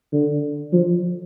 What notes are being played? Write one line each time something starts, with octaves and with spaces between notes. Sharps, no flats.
D3
F3